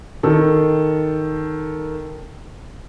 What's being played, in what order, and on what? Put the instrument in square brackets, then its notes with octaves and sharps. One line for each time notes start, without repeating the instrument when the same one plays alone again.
[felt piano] D#3 A4